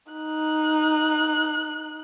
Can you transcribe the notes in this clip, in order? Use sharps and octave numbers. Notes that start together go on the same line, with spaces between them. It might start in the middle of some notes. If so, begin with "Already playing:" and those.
D#4 F#6